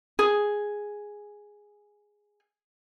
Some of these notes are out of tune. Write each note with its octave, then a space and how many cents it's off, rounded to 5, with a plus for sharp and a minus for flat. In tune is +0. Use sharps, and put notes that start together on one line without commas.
G#4 +0